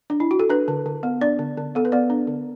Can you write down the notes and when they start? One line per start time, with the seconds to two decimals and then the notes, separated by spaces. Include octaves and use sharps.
0.10 D4
0.20 E4
0.31 F#4
0.39 A4
0.50 D4 B4
0.68 D3
0.86 D3
1.03 B3
1.21 D4 D5
1.39 D3
1.57 D3
1.75 B3 A4
1.85 B4
1.92 B3 D5
2.10 D4
2.27 D3